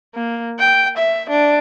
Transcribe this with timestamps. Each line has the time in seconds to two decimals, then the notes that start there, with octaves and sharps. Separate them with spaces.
0.15 A#3
0.59 G5
0.97 E5
1.29 D4